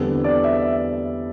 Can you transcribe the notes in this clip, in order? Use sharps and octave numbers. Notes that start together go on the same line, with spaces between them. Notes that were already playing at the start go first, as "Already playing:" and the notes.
Already playing: E2 D3 G3 C4 A4
D5
E5
E5